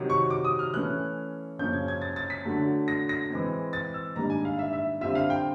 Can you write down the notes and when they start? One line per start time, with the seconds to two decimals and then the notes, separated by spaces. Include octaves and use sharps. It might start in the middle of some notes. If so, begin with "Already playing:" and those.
Already playing: C3 D#3 F#3
0.10 C#6
0.30 D6
0.45 D#6
0.59 F6
0.74 E3 A3 C#4 F#6
1.59 F#2 C#3 F3 A#3 C#4 G6
1.73 G#6
1.88 G#6
2.02 A6
2.16 A6
2.30 B6
2.45 D3 F#3 A3
2.88 A#6
3.09 A#6
3.30 E3 G#3 C4
3.73 A6
3.94 E6
4.16 G#2 D#3 G3 A#3 D4 A#5
4.30 G#5
4.45 F5
4.59 E5
4.73 E5
5.01 D3 G3 C4 F4 E5
5.15 F5
5.30 G5